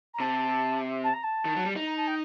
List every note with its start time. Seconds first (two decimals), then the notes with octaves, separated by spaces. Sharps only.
0.14 A#5
0.20 C3 A5
1.04 A5
1.13 A#5
1.24 A5
1.45 D#3
1.56 F#3
1.66 G3
1.76 D#4
1.87 A#5
1.97 A5
2.08 G5